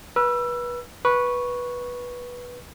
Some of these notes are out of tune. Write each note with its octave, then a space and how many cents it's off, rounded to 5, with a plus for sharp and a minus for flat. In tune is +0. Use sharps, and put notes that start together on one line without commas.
B4 -25 E6 +20
B4 -10 C#6 +0